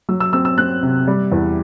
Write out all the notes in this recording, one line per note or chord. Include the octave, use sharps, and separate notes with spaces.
F#3 E6
E6
C4 E6
E6
C4 F#6
C3
G3
E2